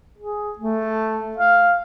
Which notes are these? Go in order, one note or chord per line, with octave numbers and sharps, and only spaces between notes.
G#4
A3
F5